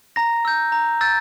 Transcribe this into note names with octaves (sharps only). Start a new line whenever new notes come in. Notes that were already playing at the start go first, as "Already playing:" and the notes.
A#5 A#6
E6 G6
A#5
E6 G6 A6